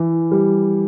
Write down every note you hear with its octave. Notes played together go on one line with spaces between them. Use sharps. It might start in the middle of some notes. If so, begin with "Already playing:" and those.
Already playing: E3
G3